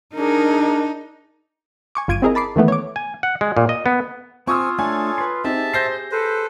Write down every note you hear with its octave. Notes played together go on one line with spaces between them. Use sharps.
D4 D#4 G#4 A#4
G#5 C#6 D6
G1 F4 G#6 D7 D#7
C4 E4 G#4 A#4 D#5
A5 B5 D6 C7
D#3 E3 A3 B3
C#5 D6
G#5
F#5
G#3
A#2
D#5
B3
C4 F4 G#5 C#6 D#6 E6
A3 D4 A4 C#5 G#5
B4 C6
C4 D#4 G4 G#4 E5 A5
C5 G6 A#6 C7
A4 B4 C5